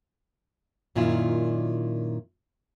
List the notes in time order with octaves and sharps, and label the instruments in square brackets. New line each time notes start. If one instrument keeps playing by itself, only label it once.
[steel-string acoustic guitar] F#2 A#2 D#3 E4 F4